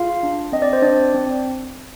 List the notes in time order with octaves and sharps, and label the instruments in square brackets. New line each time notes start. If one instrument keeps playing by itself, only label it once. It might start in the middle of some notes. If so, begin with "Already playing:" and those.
Already playing: [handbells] F4 G#4 F5
D4
C4 D#5
D5
C5
C4 D4 D5
C4